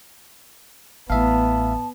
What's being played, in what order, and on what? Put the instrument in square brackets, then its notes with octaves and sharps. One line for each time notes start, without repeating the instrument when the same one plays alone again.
[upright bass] A1 [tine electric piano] A2 E5 F5 [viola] B3 [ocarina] A5